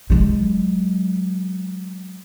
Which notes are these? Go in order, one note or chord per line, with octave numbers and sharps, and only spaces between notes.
F#3 G#3